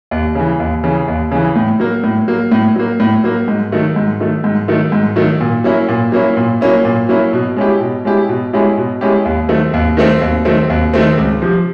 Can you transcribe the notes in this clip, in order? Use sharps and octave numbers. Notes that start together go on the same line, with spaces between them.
D#2
C#3 E3
D#2
C#3 E3
D#2
C#3 E3
A2
F#3 A#3
A2
F#3 A#3
A2
F#3 A#3
A2
F#3 A#3
G#2
D#3 F#3 A3
G#2
D#3 F#3 A3
G#2
D#3 F#3 A3
G#2
D#3 F#3 A3
A#2
F#3 A#3 C#4 E4
A#2
F#3 A#3 C#4 E4
A#2
F#3 A#3 C#4 E4
A#2
F#3 A#3 C#4 E4
B2
G#3 C#4 E4 G4
B2
G#3 C#4 E4 G4
B2
G#3 C#4 E4 G4
B2
G#3 C#4 E4 G4
D#2
D#3 F#3 A3 C4
D#2
D#3 F#3 A3 C4
D#2
D#3 F#3 A3 C4
D#2
D#3 F#3 A3 C4
C#2
C3 F3